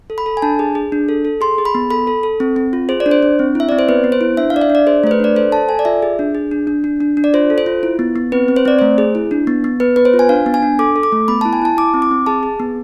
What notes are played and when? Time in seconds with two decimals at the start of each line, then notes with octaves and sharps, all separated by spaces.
0.10 A4
0.18 B5
0.26 A4
0.37 G#5
0.42 D4 A5
0.59 G#4
0.75 G#4
0.92 D4
1.09 A4
1.25 A4
1.41 G#4 C6
1.58 G#4
1.65 B5
1.75 B3
1.91 A4 B5
2.07 A4
2.23 A4
2.40 C4
2.56 C4
2.73 F4
2.89 G#4 C5
3.00 D5
3.06 D4
3.11 C5
3.23 D4
3.39 C4
3.55 E4 E5
3.69 C4 D5
3.79 C5
3.89 B3 B4
4.04 B3
4.12 C5
4.21 E4
4.37 D4 E5
4.50 F5
4.54 D4 D5
4.61 E5
4.70 D4
4.75 D5
4.87 G#4 C5
5.04 A3 C5
5.11 B4
5.20 D4 D5
5.36 A4 C5
5.52 A4 A5
5.69 A4 G#5
5.79 D5
5.85 F4 E5
6.02 G#4
6.19 D4
6.35 G#4
6.51 D4
6.67 D4
6.84 D4
7.00 D4
7.17 D4
7.24 D5
7.34 F4 C5
7.50 A4
7.58 C5
7.66 F4
7.83 E4
7.99 B3
8.16 B3
8.32 C4 B4
8.48 C4
8.56 C5
8.65 C4 D5
8.79 A3 C5
8.98 G#4
9.15 E4
9.31 D4
9.47 B3
9.64 B3
9.80 B3 B4
9.96 B3 B4
10.05 C5
10.14 F4
10.19 G#5
10.29 D4 F5
10.46 B3
10.54 G#5
10.62 D4
10.79 A4 D6
10.96 A4
11.03 D6
11.12 A3
11.28 B3 B5
11.41 A5
11.45 E4
11.53 G#5
11.62 E4 A5
11.77 E4 D6
11.94 C4
12.02 D6
12.11 C4
12.26 G#4 A5
12.43 G#4
12.60 B3